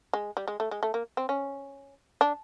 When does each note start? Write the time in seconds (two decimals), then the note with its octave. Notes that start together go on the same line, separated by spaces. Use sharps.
0.13 G#3
0.37 G3
0.48 G#3
0.60 A3
0.71 G#3
0.83 A3
0.94 A#3
1.17 C4
1.29 C#4
2.21 D4